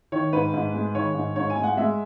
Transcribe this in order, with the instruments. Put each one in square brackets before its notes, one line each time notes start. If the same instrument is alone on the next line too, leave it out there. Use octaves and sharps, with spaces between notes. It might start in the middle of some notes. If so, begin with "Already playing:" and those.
[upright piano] D#3 C#5
G#2 B4
G#2
G#3
D#3 C#5
G#2
G#2 C#5
G#5
G#3
F#5
G#3 E5